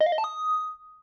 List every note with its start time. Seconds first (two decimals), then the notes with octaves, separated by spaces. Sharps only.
0.01 D#5
0.06 F5
0.12 D#5
0.18 A5
0.24 D#6